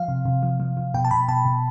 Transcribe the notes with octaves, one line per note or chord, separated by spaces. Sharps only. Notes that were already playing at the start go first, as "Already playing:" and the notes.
Already playing: F3 F5
C3
C3
F3
F3
F3
B2 G5
A5
B2 B5
B2 A5
B2